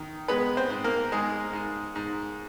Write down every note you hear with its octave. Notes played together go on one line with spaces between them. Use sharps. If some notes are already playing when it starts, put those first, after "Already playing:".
Already playing: D#3
G#3 B3 B4
C4 C5
G#2
A#3 A#4
G#2 G#3 G#4
G#2
G#2